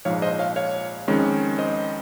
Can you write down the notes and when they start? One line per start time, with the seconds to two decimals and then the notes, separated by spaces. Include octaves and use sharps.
0.05 A#1 G#2 F3 C#5 F5
0.22 C5 D#5
0.39 C#5 F5
0.56 C#5 F5
1.08 F2 D#3 G#3 C#4
1.59 C5 D#5